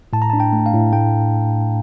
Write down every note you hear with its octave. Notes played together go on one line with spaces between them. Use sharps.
A2 A5
A#5
D4 A5
G5
A3
F5
A2
A2 G5